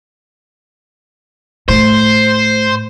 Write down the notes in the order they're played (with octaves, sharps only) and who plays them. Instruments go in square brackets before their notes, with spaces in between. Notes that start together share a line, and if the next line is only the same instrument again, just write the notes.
[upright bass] A2 [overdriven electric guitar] C5